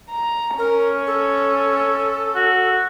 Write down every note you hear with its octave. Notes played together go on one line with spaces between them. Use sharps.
A#5
C#4 A#4
A4
F#4